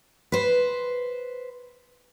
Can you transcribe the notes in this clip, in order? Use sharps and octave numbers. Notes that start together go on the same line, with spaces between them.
B4 C5